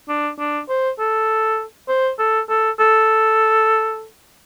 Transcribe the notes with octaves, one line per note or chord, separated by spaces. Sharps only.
D4
D4
C5
A4
C5
A4
A4
A4